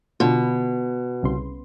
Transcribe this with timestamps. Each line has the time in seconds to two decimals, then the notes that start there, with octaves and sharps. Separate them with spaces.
0.20 B2 D3 F4
1.23 C2 C#3 C6